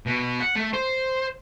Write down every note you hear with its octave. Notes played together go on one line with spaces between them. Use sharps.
B2
F#5
A3
C5